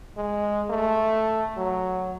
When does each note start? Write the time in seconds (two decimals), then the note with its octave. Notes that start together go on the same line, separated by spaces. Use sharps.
0.17 G#3
0.70 A3
1.57 F#3